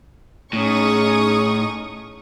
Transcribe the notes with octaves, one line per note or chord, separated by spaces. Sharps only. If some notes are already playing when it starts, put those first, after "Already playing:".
A2 C#4 D#4 G#4 C#6 D#6